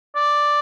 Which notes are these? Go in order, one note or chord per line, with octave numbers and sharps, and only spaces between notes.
D5